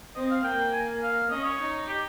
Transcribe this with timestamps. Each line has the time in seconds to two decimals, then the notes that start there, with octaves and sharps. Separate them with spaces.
0.16 C4 D#5
0.31 F5
0.44 A#3 G5
0.73 G#5
1.02 F5
1.30 C#4 D#5
1.44 C#5
1.59 D#4
1.88 G4